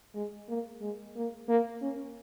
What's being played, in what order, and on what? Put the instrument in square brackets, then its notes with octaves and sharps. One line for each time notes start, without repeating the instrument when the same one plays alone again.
[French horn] G#3
A#3
G#3
A#3
A#3
C#4